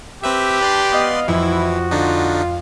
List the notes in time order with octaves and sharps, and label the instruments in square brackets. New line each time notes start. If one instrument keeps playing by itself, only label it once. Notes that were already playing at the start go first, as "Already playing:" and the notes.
[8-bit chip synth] C4 B4 E5 [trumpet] G4
[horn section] D4 [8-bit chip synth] B4 D5 C6
[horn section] B3 D#5 F5
[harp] F2 [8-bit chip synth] E3 [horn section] E4 [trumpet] F#4
[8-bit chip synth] D3 D4 D#4 [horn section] F4